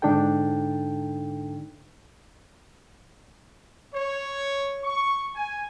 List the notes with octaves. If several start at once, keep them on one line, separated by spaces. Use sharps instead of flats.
G#2 D3 D4 D#4 A4 G5
C#5
C#6
G#5